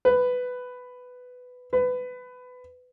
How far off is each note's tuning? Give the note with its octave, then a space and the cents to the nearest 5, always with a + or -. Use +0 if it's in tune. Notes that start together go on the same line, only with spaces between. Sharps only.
B4 +10
B4 +20